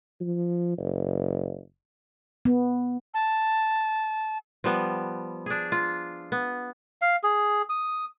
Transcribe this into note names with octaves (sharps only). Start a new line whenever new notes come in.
F3
F#1
B3
A5
F3 G3 B3
D4 G#4
F4
B3
F5
G#4
D#6